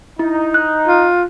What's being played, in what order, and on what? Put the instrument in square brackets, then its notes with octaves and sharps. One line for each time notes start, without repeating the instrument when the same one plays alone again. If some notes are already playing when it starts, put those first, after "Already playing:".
[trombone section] D#4 [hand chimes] E4
[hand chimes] F#6
[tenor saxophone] F4